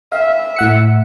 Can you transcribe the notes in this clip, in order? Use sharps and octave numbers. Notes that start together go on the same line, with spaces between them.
E5 F5
A2 F#5 C#7